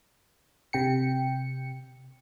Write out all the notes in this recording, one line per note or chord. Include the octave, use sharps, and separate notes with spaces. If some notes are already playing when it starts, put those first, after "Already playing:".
C3 G5 C#7